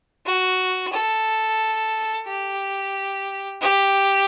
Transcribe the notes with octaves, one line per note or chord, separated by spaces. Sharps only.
F#4
A4
G4
G4